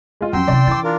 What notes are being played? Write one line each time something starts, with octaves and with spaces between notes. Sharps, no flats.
G#3 F4
F2 F#3 C#4 G5 C6 E6
C3 E3 D5
E3 D6 A6
D4 F4 A#4